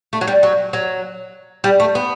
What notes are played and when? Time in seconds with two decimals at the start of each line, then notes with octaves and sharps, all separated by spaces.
0.13 A3
0.21 F#3
0.27 G3
0.43 F#3
0.73 F#3
1.64 G3
1.80 A3
1.95 B3